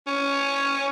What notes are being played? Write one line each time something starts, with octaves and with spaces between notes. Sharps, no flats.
C#4